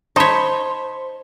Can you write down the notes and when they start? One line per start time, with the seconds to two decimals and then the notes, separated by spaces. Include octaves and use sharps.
0.16 D#4 C5 C#5 A5 B5 B6